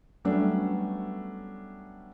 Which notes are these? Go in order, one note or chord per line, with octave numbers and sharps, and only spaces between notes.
F#3 G3 A3 B3 C#4 D4